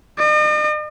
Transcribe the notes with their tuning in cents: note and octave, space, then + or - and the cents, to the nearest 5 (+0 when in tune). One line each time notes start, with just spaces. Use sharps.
D#5 -45